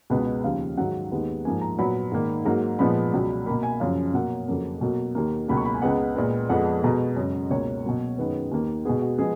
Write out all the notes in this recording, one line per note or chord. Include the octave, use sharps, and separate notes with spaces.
C#2 B2 G#3 B3
D#2 C#3 F3 F5
G#2 D#3 F#3 F#5
D#2 D#3 G#3 B3
G#2 F3 A#3 G#5
A#5
A#2 F#3 B3 B5
G#2 D#3 A#3
G#2 F#3 A#3 A#5
A#2 F3 G#3 B3 B5
C#2 B2 F#3
B2 A#3 B5
G#5
F#2 C#3 F3 F5
B2 F#3 A#3 F#5
F2 C#3 F#3 A#3
B2 F#3 A#3
D#2 D#3 A#3
C#2 B2 F#3 A#3 B5
C#6
B5
G#5
C#2 C#3 G#3 B3 F#5
A#2 G#3 B3
F2 F3 G#3 B3 F#5
B2 G#3 B3 A#5
F#2 C#3 G#3
C#2 B2 A#3 C#5
B2 F#3 A#3
F#2 D#3 G#3 B3 B4
D#2 D#3 A#3
B2 G#3 B3 G#4
F#4
F3 G#3 B3 G#4